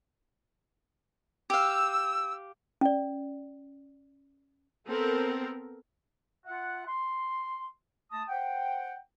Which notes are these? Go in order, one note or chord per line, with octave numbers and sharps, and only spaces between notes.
G4 F5 E6
C#4 D5
B3 C4 A4 A#4
F4 E5 F#5
C6
A3 A5 D#6
C5 F#5 G5